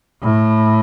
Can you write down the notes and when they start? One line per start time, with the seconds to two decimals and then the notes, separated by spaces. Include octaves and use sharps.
0.22 A2